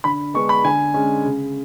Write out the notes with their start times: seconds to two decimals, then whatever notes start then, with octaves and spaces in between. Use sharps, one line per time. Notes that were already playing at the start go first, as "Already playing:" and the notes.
0.04 D3 B5
0.34 G#3 B3 D4 C#6
0.49 B5
0.64 D3 G#5
0.94 G#3 C#4
1.25 C#3